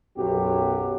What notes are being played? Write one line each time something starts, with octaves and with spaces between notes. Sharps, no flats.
B1 F#2 F#3 F#4 G4